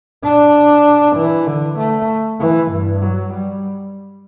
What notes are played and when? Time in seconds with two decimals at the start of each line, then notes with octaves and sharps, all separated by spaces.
0.23 D4
1.16 E3
1.47 D3
1.79 A3
2.40 E3
2.72 G2
3.02 F#3
3.33 G3